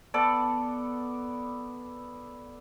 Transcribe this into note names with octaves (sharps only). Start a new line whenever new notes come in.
B3 A4 D5